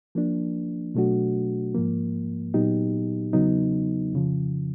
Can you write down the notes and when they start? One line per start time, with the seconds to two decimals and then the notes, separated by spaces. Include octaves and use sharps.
0.15 F3 A#3 D4
0.95 B2 F#3 A3 D4 F#4
1.74 G#2 F3 A#3
2.54 A#2 F#3 B3 D#4 G4
3.33 E2 C#3 F#3 B3 D#4
4.13 F2 C#3 F3